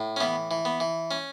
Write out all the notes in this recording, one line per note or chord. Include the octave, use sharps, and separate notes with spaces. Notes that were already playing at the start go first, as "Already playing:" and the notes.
Already playing: A2
C#4
E3 B3
E3
B3
E3
C#4